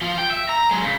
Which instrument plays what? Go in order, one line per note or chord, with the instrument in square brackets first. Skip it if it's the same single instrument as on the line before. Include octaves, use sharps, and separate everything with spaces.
[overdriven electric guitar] F3 F4
G5
E5
A#5
F#3 G#3
C#3